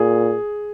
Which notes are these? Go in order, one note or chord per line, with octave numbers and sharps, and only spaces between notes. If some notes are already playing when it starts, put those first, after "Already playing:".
Already playing: A#2 G#4